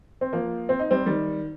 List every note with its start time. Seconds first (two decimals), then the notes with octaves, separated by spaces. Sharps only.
0.21 C4
0.33 F3 A#3
0.69 C4
0.79 D#4
0.91 G3 C4
1.06 D#3 G3